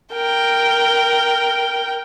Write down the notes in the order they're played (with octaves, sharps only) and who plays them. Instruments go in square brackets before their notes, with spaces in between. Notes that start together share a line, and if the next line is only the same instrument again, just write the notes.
[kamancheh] A#4 G5